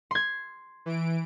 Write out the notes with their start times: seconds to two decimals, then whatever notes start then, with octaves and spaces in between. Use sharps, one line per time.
0.11 C6 G#6
0.86 E3 D7